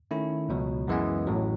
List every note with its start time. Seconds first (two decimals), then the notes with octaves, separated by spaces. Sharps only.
0.11 D#3 A3 C#4 E4
0.49 C#2 B2 F#3
0.88 F#2 E3 G#3 B3
1.27 A1 A2 F#3